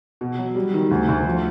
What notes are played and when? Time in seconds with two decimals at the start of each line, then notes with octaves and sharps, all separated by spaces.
0.21 B2
0.38 F#3
0.55 G3
0.74 D#3
0.91 D2
1.08 D2
1.25 F3